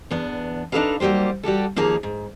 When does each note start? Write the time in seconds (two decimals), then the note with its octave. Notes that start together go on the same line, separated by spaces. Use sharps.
0.11 E2 B3 D4
0.72 D4 D#4 G#4 A4 B4 F5
1.00 F#3 G3 A#3 G4 C5
1.43 G3 F#4 G4 A4
1.76 D#2 F3 A#3 D#4 G#4 A#4
2.03 G#2